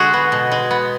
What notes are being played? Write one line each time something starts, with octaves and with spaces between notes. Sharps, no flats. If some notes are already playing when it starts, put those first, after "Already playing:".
Already playing: D3 G#3 F#4 G#4
B3
B2
G#3
B3